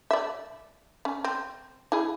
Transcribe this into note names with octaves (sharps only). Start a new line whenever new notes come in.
D5 E5
C#4
C4
E4 G#4